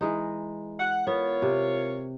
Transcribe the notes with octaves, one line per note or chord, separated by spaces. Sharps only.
E3 G#3 D#4
F#5
B3 F4 A#4 C#5
C3